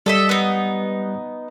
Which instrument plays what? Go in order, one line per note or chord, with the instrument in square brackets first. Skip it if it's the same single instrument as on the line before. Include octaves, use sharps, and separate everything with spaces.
[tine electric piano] G3 [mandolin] A4 D#5 E5
[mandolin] B3 D#4